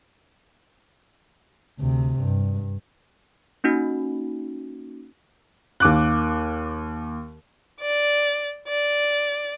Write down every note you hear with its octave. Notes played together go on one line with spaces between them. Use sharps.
D2 C3
G2
A#3 C#4 D#4 F#4
D#2 D6 F#6
D5
D5